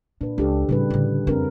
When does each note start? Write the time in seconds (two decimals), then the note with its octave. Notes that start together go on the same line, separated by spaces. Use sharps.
0.21 A#2 D4 B4
0.38 C#2 D4 G4 A4
0.69 A2 C#3 G3 C4 B4
0.90 A2 D3
1.27 F2 C4 D4 A#4 B4